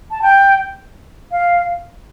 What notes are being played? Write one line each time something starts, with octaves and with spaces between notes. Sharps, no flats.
A5
G5
F5